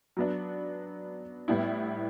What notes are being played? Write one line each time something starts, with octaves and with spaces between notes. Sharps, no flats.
F#3 B3 D4
A2 G3 B3 E4